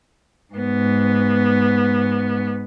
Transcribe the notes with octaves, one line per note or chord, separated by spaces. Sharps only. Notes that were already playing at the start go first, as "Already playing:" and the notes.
G#2 B3